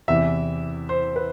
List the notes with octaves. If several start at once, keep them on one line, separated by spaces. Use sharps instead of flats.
E2 C3 E3 E5
C5
B4